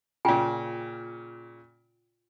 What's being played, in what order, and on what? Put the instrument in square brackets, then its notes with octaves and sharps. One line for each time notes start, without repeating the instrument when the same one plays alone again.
[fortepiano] A#2 C#3 [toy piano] F4 G5 G#5